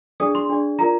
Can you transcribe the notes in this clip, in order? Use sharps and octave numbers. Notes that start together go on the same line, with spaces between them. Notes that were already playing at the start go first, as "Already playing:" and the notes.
D4 G#4 D5 D#6
C6
D4 G#4 D5
F4 A#4 D5 A#5